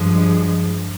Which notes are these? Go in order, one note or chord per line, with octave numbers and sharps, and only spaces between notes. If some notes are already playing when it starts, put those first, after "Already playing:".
Already playing: G2 F3 G#3